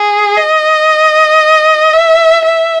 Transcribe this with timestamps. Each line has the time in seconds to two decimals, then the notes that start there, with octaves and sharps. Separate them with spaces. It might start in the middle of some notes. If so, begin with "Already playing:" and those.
Already playing: G#4
0.37 D#5
1.93 E5
2.45 E5